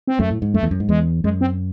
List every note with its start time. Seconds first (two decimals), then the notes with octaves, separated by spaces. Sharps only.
0.07 C4
0.19 F#2 A3
0.31 A2
0.42 G#2
0.54 F#2 A3
0.63 E2
0.71 F#2
0.80 G#2
0.89 E2 G#3
1.24 F#2 G#3
1.41 C4